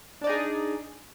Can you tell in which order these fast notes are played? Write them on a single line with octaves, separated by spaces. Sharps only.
D4 D5 D#4 G#4